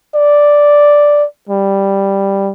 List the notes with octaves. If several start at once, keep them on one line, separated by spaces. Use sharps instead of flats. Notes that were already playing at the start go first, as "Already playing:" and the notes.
D5
G3